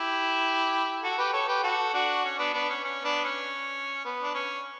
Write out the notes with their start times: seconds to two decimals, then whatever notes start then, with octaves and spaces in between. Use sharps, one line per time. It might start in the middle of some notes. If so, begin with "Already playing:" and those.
Already playing: E4 G4
1.03 F#4 A4
1.18 G4 B4
1.33 A4 C#5
1.48 G4 B4
1.63 F#4 A4
1.93 D4 F#4
2.24 C#4
2.39 B3 D4
2.54 B3 D4
2.69 C#4
2.84 C#4
3.04 B3 D4
3.24 C#4
4.05 B3
4.23 D4
4.34 C#4